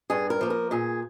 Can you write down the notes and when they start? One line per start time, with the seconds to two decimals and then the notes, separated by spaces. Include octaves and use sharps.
0.10 G2 G#4
0.30 A#4
0.41 F3 A#3
0.50 A#4
0.71 A#2 G#4